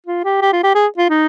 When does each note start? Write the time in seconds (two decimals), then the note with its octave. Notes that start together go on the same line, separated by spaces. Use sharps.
0.06 F4
0.25 G4
0.41 G4
0.52 F4
0.63 G4
0.75 G#4
0.97 F4
1.09 D#4